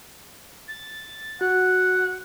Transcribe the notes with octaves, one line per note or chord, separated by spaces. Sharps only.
A6
F#4 F#5